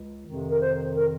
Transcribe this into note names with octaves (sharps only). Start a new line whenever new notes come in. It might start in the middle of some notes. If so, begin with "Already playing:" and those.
Already playing: C#2
F2 C3 D#3
A#4
C5
A#4